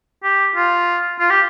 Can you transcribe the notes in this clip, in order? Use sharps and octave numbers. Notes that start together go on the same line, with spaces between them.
G4
F4
F4
G4